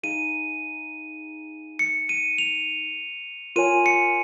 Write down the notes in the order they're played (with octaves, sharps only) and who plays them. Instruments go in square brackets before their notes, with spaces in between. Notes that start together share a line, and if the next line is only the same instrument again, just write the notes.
[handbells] D#4 G#4 F5 G#5 [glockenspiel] D#7
[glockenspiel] C#7
D#7
F7
[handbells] F4 A#4 C#5 G#5 [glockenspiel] D#7
[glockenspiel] C#7